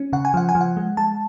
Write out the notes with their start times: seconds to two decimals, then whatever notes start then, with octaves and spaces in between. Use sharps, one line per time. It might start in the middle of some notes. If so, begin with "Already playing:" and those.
Already playing: C#4
0.13 C#3 F#5
0.25 G#5
0.34 F3 F#5
0.49 G#5
0.55 F3
0.61 F#5
0.77 G#3
0.97 G#3 A5